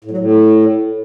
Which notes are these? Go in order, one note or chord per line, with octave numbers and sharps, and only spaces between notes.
A2
F#3
A2